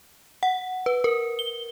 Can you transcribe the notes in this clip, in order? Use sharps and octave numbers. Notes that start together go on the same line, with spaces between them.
F#5
B4
A#4
G7